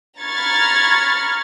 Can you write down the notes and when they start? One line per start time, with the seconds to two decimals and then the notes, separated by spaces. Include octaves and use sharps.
0.21 A#5 B5 C#6 F6 G#6 A6